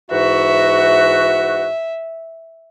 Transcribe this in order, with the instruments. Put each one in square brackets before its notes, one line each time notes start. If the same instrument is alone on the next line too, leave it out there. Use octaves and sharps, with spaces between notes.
[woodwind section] G#2 E3 F#4 [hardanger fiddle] E5